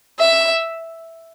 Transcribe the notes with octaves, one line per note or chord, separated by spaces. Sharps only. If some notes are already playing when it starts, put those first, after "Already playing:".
E5